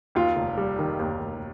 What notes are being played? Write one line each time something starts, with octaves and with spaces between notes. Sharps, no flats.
D#2 F4
F1
G3
D#3
D#2
F1